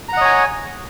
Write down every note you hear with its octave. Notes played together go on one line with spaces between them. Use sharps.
C#5 D#5 F#5 G#5 A#5